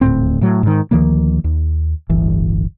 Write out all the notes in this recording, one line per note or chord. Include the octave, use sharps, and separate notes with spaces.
D#1 D2 A2 C4
A2 F#3
G#2 D#3
D2 D#3 F3 A#3
D#2
D1 G1 E3